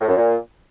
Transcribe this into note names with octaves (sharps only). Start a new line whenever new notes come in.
A2
F#2
A#2